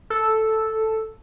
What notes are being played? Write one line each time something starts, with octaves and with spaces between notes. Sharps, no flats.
A4